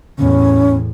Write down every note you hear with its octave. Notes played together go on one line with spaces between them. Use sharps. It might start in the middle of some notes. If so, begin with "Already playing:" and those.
E2 A2 C#4